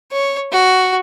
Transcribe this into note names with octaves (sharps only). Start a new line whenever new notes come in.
C#5
F#4